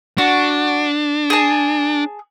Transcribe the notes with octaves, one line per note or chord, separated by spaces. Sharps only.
D4 F#4
G#4 A5